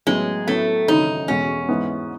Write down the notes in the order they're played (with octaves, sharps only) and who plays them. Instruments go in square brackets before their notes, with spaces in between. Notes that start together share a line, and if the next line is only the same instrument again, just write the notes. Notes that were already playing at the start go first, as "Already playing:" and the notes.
[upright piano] A1 A2 F#3 B3 [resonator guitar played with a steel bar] G#3
[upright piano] A2 F#3 B3 E4 [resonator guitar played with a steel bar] A3
[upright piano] G#1 F#2 C#3 E3 [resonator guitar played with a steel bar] D#4
[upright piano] E1 E2 B2 G#3 [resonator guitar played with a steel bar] C#4
[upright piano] G#2 E3 B3